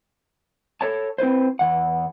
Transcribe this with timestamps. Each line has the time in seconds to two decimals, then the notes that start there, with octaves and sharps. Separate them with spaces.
0.81 A4 C#5 A5
1.18 C4 E4 B4 C5
1.59 E2 F#5